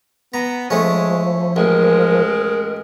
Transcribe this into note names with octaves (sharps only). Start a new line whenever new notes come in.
B3 A#5
F3 G#3 A3 C#4
A1 G#3 A#4